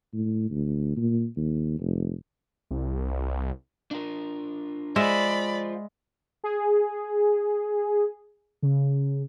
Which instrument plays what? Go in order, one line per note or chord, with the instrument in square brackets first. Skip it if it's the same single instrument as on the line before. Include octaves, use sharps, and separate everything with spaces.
[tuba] A2
D2
A#2
D#2
F1
[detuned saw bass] C2
[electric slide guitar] D4 F4 A#4
[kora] G#3 E5 [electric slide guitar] F4 C5 [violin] D5 B5
[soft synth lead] G#4
C#3